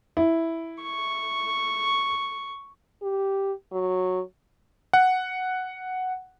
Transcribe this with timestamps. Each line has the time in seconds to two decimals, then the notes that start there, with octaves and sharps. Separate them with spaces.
0.17 E4
0.82 C#6
3.02 G4
3.72 F#3
4.93 F#5